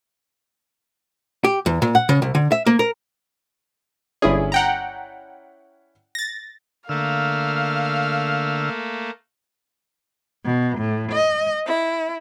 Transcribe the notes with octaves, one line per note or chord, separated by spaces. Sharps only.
G4
E2
A#2
F#5
C#3
C2
D3
E5
A#3
A#4
G1 C#4 E4 G#4 D5
F#5 G5 A#5
A6 A#6
D3 A3 A#3 F5 E6 F6
B2
A2
D#5
E4